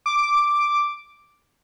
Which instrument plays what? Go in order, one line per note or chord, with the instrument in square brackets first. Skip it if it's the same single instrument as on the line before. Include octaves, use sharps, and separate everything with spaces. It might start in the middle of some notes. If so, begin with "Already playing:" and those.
[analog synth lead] D6